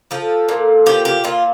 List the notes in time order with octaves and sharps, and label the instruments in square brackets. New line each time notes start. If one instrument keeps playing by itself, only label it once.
[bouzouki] F3 A4
A#2
F3 G4
G4
A#2 F4